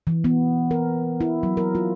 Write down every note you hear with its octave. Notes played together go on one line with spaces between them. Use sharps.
E3
B3
A#4
E4
F#3
A#4
F4